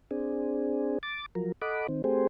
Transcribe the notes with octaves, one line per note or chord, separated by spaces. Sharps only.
C4 D4 G#4
D6 A6
F3 F#3 A#4
A4 D#5 F#5 B5 D6
D#3 C4
A3 C4 G4 G#4 C5